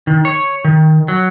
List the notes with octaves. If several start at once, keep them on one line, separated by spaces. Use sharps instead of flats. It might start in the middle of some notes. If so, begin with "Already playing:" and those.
D#3
C#5
D#3
F#3